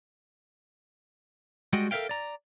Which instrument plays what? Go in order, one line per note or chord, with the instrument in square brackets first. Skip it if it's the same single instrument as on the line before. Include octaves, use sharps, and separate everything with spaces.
[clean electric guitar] G3 G#3 F#4 D#5 F#5 G5
A4 A#4 C#5 E5 F5 G5
D5 A#5